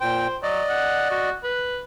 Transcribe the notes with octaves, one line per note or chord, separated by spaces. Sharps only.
A#2 C5 G5
F#3 D5 D#5
F#5
F#4
B4